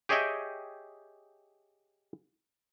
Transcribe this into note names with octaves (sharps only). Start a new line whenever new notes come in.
G4 G#4 C#5 D#5 E5 G5